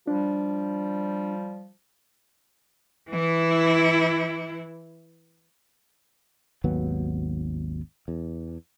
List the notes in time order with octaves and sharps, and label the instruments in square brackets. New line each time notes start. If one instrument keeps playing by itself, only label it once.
[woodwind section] F3 G3 [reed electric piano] D4
[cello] E3 E4
[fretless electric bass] G#1 D#2 F#3 B3
E2